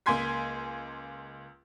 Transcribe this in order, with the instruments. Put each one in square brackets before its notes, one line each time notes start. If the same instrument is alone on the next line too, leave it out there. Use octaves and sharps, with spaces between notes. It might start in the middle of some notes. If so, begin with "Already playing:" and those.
[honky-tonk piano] C#2 A#3 G#5 C6 G#6 B6